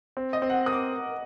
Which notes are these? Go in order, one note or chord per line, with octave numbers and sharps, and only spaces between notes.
C4
D#5
C4
F#5
A#4 D#6
D6